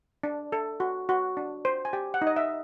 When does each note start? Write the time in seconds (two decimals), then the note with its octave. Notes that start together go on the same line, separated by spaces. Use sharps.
0.23 D4
0.52 A4
0.80 F#4
1.09 F#4
1.37 D4
1.65 C5
1.85 G#5
1.93 G4 G5
2.14 F#5
2.22 D#4
2.27 D#5
2.36 E5